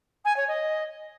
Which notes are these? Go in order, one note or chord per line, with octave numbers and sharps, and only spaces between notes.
G#5
C#5
D#5